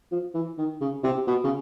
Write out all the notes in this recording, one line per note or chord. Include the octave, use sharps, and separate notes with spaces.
F3
E3
D#3
C#3
C3
B2
C#3